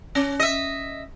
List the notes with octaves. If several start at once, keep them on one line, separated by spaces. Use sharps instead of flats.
C#4
D#5 E5